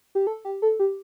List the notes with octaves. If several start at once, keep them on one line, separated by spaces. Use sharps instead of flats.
G4
A4
G4
A4
G4